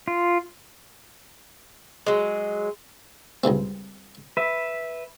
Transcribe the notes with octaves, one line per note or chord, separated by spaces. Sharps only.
F4
F#3 G#3
C#2 G2 C3 C4
B4 E5